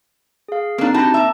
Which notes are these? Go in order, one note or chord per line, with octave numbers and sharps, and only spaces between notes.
G#4 F5
A#3 C4 D4 D#4
G3 D#4 F#4 A5
A#3 E5